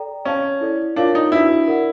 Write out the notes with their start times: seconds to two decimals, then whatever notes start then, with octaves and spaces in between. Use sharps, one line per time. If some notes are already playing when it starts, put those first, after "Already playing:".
Already playing: A4 D5 G5 A#5
0.25 C#4 C#5 F5 A5
0.61 E4 A4 D5
0.96 D4 F4 A#4 C#5 F5
1.15 D#4
1.32 D4 E4 F#4 B4
1.68 A#4 D5 F#5